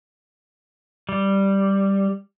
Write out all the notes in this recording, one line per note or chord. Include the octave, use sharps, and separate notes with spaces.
G3